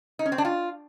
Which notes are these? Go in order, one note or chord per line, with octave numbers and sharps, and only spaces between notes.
D#4
C#4
C4
D4
F4